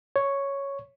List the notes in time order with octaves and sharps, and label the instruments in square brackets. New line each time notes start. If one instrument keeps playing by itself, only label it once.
[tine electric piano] C#5